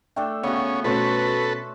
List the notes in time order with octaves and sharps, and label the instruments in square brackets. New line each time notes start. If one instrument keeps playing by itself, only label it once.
[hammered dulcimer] A3 D4 A4 [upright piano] G5
[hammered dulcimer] C#3 F#4 [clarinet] B3 [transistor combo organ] C#4
[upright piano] B2 A3 C#4 [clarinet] F#4 [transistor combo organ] A4 B4 [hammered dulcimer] C5